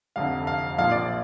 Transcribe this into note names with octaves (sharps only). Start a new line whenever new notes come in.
F1 F2 D3 F5
F5
A#1 A#2 F3 F5
D5